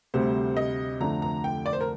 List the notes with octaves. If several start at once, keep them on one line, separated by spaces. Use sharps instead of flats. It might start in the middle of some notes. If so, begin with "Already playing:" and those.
D2 C3 G3 C5
D#5
F2 D3 A3 D4 A#5
A#5
G5
D5
C5
A#4